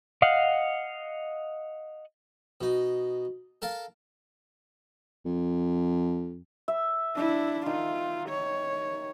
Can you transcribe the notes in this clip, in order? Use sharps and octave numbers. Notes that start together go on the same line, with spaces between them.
D#5 F5 F#5
B2 D#4
A4 A#4 F5 A5
F2
E5
D4 E4
D#3 F4
C#5